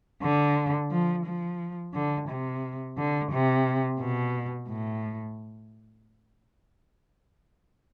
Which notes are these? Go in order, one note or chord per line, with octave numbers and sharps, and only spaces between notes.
D3
F3
F3
D3
C3
D3
C3
B2
A2